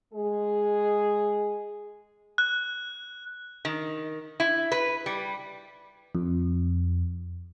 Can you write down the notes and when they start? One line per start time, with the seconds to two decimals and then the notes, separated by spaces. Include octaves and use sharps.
0.13 G#3 G#4
2.38 F#6
3.65 D#3
4.40 E4
4.72 B4
5.06 G3
6.15 F2